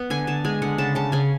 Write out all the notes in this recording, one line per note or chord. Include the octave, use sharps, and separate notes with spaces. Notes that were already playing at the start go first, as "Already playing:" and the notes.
Already playing: B3
D3 G#5
D3 A5
G#3 G#5
D3 F#5
C#3 A5
C#3 A5
C#3 G#5